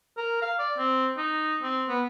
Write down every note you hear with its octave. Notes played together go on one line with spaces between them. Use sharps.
A#4
F5
D5
C4
D#4
C4
B3